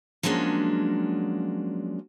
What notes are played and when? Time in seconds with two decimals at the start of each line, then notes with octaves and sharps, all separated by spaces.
0.23 F3 F#3 G#3 A#3 C#4 D4